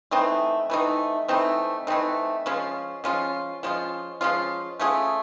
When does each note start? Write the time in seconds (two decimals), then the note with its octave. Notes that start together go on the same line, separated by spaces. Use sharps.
0.11 E3 A3 C4 D#4
0.70 E3 A3 C4 D#4
1.28 E3 A3 C4 D#4
1.87 E3 A3 C4 D#4
2.46 F3 G#3 C#4 F4
3.04 F3 G#3 C#4 F4
3.63 F3 G#3 C#4 F4
4.21 F3 G#3 C#4 F4
4.80 A3 C#4 F4 G#4